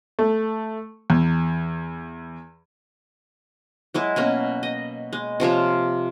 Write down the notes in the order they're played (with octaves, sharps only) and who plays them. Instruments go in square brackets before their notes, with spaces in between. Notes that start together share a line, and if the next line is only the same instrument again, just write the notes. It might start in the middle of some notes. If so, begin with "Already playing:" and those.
[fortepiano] A3
E2
[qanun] F#3 G#3 E4
B2 A#3 C#4
D#5
G#3
C3 F3 F4 C#5